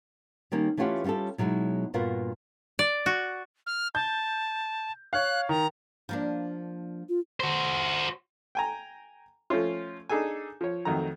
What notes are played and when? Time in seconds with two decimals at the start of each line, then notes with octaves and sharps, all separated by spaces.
0.52 D#3 G3 A#3 C#4
0.77 E3 A3 C#4 F4 G4 F#5
1.04 G3 C#4 F4 G4 A4
1.38 B2 F#3 G#3 D#4 E4
1.94 G2 A#2 B3 F4 F#4 A#4
2.79 D5
3.06 F#4
3.66 F6
3.95 A5 G6
5.13 C#5 F5 F#6
5.49 D#3 A#5
6.09 F3 A#3 D4
7.09 F4
7.40 F#4 C5
8.55 G5 G#5 A#5
9.50 F3 A3 C#4 F4
10.09 D4 D#4 G#4 A4 G#5
10.61 F3 C#5
10.85 F2 D#3 F#3 A3 A#5